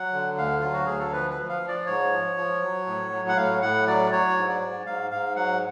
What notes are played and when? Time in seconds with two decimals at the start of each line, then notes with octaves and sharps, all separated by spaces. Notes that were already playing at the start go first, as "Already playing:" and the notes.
Already playing: F#3 F#5
0.13 D3
0.38 D2 F5
0.60 F#3 F4
0.73 F#4
0.86 D2 G#4
0.99 A4
1.13 F3 B4
1.30 B4
1.37 F3
1.49 F5
1.62 F3
1.68 D5
1.87 G#2 C#5
2.13 F3
2.37 F3
2.62 F#3
2.87 A2
3.11 F#3
3.28 F#5
3.37 A2 F5
3.62 A2 F#5
3.87 F#3 D5
4.11 F#3 C#5
4.37 G#2
4.49 D5
4.62 G#2
4.86 G#2 F5
5.11 G#2 F5
5.36 F#3 F#5